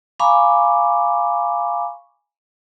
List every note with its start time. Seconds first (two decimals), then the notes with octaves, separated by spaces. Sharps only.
0.20 F5 G#5 A#5 B5 C#6 D6